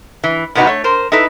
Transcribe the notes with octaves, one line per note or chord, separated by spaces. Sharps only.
E3
A2 C3 B3 D#4 F#4
A3 C#5
A#4 C5
D#4 E4 A4 B4